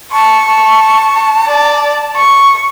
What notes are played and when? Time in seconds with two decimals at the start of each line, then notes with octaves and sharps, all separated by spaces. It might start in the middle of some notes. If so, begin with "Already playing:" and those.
0.12 A5 C#6
1.47 D5
2.16 C#6